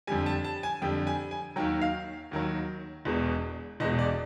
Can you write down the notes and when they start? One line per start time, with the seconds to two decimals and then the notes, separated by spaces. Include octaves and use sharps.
0.07 F2 D3 G3 G#5
0.26 A5
0.44 A5
0.63 G#5
0.82 F2 D3 G3 G5
1.07 G#5
1.31 G#5
1.56 D#2 D#3 F#3 G5
1.81 F5
2.31 D#2 D#3 F#3
3.05 E1 E2 B2 G#3
3.80 E1 E2 B2 G#3 D#5
3.99 D5